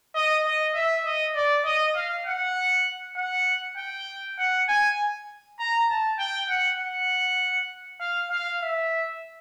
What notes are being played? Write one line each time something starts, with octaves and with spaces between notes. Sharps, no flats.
D#5
D#5
E5
D#5
D5
D#5
F5
F#5
F#5
G5
F#5
G#5
A#5
A5
G5
F#5
F#5
F5
F5
E5